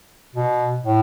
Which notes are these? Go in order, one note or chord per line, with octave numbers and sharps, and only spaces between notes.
B2
A2